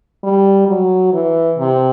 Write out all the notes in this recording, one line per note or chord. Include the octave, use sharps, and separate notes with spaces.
G3
F#3
E3
C3